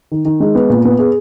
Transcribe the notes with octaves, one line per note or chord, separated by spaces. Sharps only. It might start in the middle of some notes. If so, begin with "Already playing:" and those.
D#3
D#3
G#3
B3
A#2
B3
G#4